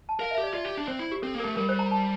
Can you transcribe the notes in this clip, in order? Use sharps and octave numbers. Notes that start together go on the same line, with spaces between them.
A5
A#4 F5
E5
G4
D5
F4 D5
G4
D4
C4 C5
E4
G4
C4 A4
A#3
A#4
A3
G3 A#4
C5
A#5
A5